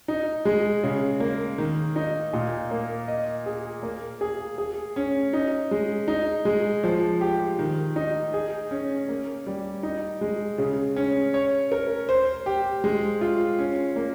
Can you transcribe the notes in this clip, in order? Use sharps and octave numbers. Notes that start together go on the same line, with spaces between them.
D#4
G#3
C#3
A#3
D#3
D#4
A#2
A#3
D#5
G#4
A#3
G#4
G#4
C#4
D#4
G#3
D#4
G#3
F3
G4
D#3
D#4
G#4
C#4
A#3
G3
D#4
G#3
C#3
C#4
C#5
A#4
C5
G4
G#3
F4
C#4
A#3